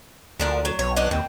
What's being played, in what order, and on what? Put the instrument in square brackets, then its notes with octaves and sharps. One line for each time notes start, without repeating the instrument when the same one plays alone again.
[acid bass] D2 [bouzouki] F3 D4 A#4
[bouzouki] F#3
[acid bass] B1 [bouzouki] C#5
[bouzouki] F#3 D4 D#4
[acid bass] D#2 [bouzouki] C4